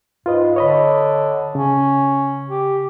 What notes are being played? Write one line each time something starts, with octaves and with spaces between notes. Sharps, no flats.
G#2 F4 B4 D#5
D3 C#5 D#5 B5
C#3 C#4
G4